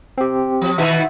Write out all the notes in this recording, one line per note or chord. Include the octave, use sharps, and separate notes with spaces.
C4 G4
F3
B2 D#3 F#4 E5